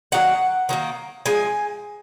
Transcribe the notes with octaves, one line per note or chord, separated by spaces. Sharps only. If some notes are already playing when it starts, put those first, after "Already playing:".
D#3 F#3 A#3 F#5
D#3 F#3 A#3
F3 G#3 G#5